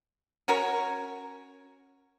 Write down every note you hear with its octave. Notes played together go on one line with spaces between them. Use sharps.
C#4 F#4 A#4 C#5